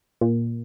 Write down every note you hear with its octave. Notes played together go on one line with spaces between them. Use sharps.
A#2